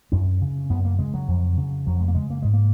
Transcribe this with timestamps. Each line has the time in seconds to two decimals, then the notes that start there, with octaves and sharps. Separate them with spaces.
0.12 F#2 C#4
0.41 C#3
0.70 F#2 B3
0.85 A#3
0.99 C#3 G#3
1.14 F#3
1.28 F2
1.57 C#3
1.87 F2 F#3
2.00 G#3
2.08 A#3
2.15 C#3 G#3
2.30 A#3
2.42 G#2 G#3
2.54 A#3